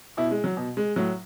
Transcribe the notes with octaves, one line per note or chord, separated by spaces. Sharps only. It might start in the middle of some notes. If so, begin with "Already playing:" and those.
B2 E4
G#3
F#3
B2
G#3
A2 F#3